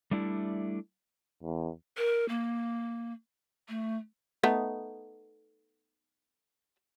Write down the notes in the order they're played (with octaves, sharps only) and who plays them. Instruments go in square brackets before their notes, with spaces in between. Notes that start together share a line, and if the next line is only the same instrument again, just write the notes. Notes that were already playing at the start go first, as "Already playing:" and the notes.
[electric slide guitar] G3 A3 D4 E4
[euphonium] E2
[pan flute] A#4
A#3
A3
[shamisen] A3 B3 D#4